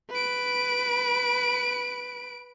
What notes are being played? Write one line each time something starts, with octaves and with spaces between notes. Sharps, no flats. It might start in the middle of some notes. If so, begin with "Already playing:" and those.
B4 D7